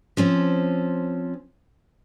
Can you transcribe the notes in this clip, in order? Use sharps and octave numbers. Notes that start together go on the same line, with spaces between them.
F3 C4 C#4